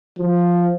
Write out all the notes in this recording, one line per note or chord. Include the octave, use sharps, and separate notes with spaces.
F3